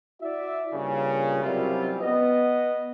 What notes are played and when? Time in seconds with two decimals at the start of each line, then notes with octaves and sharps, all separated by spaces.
0.22 E4 F#4 D5 E5
0.73 G2 A#2 C#3
1.43 F#2 C3 G3 E4 F4
2.00 B3 D#5